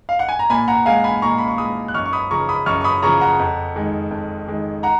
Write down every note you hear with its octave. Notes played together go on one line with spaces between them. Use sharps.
F5
F#5
G#5
A#5
A#2 G#5 B5
F#5 A#5
G#3 F5 G#5
G#5 B5
A#2 A#5 C#6
B5
C#6
G#3 B5 D#6
F#6
F#2 C#6 F6
C#6
B5 D#6
C#3 F3 A#5 C#6
B5 D#6
F#2 C#6 F6
C#6
B5 D#6
C#3 F3 A#5 C#6
F#5 A#5
F2
D#3 G#3
F2
D#3 G#3
F#5 A#5